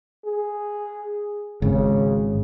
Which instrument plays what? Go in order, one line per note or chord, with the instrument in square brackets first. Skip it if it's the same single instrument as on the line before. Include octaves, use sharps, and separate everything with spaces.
[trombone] G#4
[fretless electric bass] G#1 [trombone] C#3